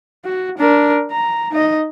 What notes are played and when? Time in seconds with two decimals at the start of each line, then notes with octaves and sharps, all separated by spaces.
0.25 F#4
0.58 D4 A#4
1.11 A#5
1.51 D#4 D#5